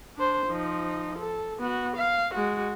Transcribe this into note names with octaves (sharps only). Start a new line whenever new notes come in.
D4 C5
F3 D#4
A4
B3 F#4
F5
G#3 F#4